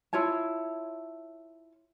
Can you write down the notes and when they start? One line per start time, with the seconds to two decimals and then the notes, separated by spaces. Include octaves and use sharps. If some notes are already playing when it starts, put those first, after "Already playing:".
0.13 E4 F4 C#5 A5